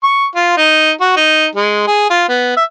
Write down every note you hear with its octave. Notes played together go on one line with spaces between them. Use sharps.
C#6
F4
D#4
F#4
D#4
G#3
G#4
F4
B3
E5